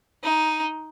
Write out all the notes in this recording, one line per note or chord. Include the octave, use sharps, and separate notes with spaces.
D#4